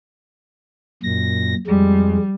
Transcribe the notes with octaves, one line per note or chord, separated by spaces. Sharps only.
F#2 A#2 A#6
F2 G3 G#3